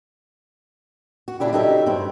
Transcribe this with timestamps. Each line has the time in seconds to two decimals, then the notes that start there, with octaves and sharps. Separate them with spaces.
1.28 F#4
1.40 A#2 C#3 D4 E4 G4
1.53 F#3 D#4 G4 A4 D#5 E5
1.86 G2 C4